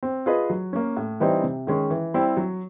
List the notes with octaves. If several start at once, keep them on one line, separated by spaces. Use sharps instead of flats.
C4
F4 G#4 B4 D#5
F#3
A#3 C#4
A2
E3 G3 C4 D#4
C3
D#3 G#3 C#4
E3
G3 C4 E4 G4
F#3